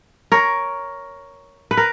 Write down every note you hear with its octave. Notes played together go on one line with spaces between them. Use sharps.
A#4 C#5
B4
A#4